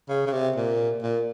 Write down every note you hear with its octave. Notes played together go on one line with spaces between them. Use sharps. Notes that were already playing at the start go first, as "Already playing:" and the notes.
C#3
C#3
C3
A#2
A#2